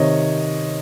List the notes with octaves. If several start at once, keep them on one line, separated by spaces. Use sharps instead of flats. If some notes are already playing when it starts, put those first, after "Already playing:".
Already playing: C3 D#3 C#5 D#5